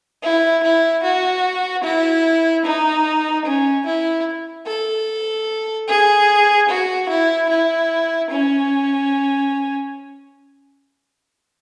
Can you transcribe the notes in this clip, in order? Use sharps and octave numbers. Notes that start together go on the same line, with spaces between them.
E4
E4
F#4
E4
D#4
C#4
E4
A4
G#4
F#4
E4
E4
C#4